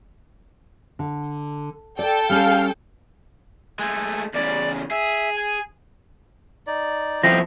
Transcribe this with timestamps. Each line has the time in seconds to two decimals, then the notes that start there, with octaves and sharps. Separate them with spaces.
0.99 D3
1.99 A4 D5 G5
2.29 G3 C#4 F5
3.79 G#3 A3 G#5
4.34 E2 C#3 D5
4.91 G#4 E5
5.36 G#5
6.67 D#4 D5
7.23 F3 C4 E4 D#5 F5 G5 A#6